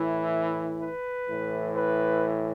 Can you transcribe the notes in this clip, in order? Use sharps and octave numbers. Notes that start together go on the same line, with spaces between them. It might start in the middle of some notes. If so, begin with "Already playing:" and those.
Already playing: A2 E3 E4
B4
A2 E3
B4